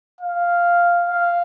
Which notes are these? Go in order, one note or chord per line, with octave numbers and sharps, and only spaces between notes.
F5
F5